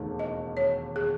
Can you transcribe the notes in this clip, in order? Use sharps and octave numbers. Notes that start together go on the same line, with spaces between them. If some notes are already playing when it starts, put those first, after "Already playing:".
Already playing: E1 D#2 D#3 A3
D#5
C#5
G#4